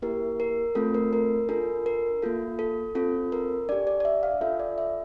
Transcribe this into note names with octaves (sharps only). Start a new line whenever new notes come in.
A#3 E4 G4 A#4
A#4
A3 C4 F4 A4
A#4
A#4
D4 F4 A4 A#4
A#4
A#3 F4 A4
A4
C4 F4 A4
A#4
D4 G4 D5
D5
D5
E5
F5
D4 F4 A4 E5
D5
E5